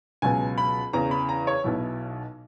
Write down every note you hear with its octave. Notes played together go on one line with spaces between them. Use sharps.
C#2 B2 F#3 G#5
B5
E2 C#3 E3 A#5
B5
A#5
C#5
B1 B2 F#3 E4